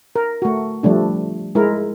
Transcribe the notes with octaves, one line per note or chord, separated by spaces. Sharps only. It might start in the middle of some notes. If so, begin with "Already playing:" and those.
A#4
A3 F#4
F3 G3 A3 D4
G#3 E4 A#4